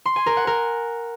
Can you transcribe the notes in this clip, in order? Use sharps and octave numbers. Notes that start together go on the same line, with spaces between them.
C6
G#5
A#4
F#5
A#4